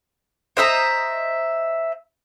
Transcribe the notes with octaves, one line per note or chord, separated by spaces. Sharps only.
C5 D#5 E5 A#5